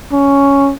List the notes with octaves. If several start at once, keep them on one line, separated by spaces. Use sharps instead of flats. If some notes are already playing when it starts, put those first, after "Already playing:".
C#4